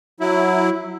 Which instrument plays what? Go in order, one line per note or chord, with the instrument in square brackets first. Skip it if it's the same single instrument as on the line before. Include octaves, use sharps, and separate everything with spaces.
[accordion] F#3 E4